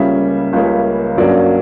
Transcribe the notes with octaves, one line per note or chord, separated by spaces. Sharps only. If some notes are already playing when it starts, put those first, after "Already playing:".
Already playing: C#2 C#3 G3 A#3 C#4 E5
C#2 C#3 G3 A#3 C#4
G2 F#3 A#3 C#4 D5